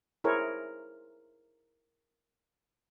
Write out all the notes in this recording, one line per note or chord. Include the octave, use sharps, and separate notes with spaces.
E4 G#4 A#4 C5 C#5